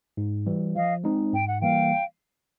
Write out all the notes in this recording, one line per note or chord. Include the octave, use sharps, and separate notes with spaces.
G#2
E3 G3
F3 D#5 F5
G#3 C4 D#4
G#2 G5
F#5
E3 G3 A#3 F5 G5